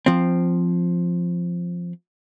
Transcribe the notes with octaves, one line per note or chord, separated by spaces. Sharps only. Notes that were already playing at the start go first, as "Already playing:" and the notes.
F3 C4